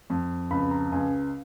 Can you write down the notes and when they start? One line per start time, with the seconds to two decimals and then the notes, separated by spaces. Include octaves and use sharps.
0.10 F2
0.51 C#2 B5
0.71 A#5
0.92 C#2 G#5